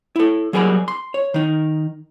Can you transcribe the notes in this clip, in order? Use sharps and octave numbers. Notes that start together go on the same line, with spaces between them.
E4 A4
F#3 G3 G#4 A#4 A5 B5
C6
C#5
D#3 D#4